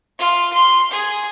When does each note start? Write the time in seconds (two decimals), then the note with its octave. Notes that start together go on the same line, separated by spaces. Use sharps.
0.19 F4
0.53 C6
0.91 G#4